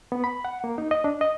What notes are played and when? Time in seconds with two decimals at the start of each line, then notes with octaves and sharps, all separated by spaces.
0.12 B3
0.24 B5
0.45 F#5
0.64 A#3
0.78 D#4
0.91 D#5
1.04 D4
1.21 D#5